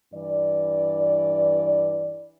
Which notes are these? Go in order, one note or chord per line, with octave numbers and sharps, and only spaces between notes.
G2 E3 D5